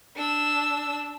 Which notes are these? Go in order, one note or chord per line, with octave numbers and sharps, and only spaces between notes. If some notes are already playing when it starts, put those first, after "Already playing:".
D4 E6